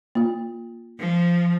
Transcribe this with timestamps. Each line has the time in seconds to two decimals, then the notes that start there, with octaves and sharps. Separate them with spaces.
0.15 A#3 F4
1.00 F3